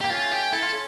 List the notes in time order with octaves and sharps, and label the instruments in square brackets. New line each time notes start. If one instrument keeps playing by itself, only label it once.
[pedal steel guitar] A#3 [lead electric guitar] G4
[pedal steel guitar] A3 C#4 [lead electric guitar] F4
[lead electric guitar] G4
[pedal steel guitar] E4 [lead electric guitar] A4
[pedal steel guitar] F4
C#4